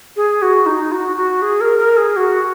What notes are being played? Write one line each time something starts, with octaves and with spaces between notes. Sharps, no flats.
G#4
F#4
D#4
F#4
F#4
G#4
A#4
A#4
G#4
F#4